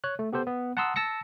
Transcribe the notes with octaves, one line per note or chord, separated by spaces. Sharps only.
C#5 F#6
A3
B3 G4 A4 C5
B3
F#5 A5 A#5 C6 D#6 E6
A5 E6 A#6 C#7